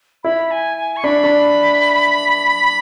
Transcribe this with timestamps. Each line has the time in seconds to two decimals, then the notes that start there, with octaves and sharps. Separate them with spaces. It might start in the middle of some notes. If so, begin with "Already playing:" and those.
0.24 E4 B5
0.51 G#5
0.77 G#5
0.97 C#6
1.04 D4 B5
1.24 D4